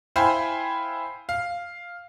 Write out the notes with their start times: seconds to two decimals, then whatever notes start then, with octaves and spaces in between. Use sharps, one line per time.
0.16 E4 C5 F5 G5 G#5 B5
1.29 F5